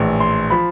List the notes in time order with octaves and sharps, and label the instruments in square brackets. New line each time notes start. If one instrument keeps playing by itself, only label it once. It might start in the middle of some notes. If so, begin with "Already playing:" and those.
Already playing: [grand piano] A#1 A2 E3
C6
F3 B5